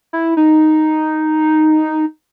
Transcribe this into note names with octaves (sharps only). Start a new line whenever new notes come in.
E4
D#4